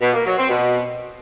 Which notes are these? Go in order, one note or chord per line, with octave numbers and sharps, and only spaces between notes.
B2
A#3
F#3
C4
B2